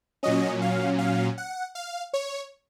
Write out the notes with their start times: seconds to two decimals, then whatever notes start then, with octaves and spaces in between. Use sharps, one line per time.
0.23 A#2 F#3 C#4 D#5
0.62 F5
0.98 F5
1.38 F#5
1.75 F5
2.13 C#5